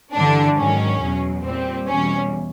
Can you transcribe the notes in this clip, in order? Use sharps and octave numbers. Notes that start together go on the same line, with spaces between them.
G2 D3 E3 G3 D4
G#2 D#3 F#3 C#4
E2 B2 F#3
A#2 G3 C4
E2 B2 G3 C#4